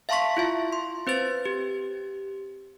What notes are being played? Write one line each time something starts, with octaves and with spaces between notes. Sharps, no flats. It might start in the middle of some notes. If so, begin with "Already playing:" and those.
E5 F5 A5 C6 C#6 B6
E4 F4 E5
C6
C4 B4 C5 A6
G4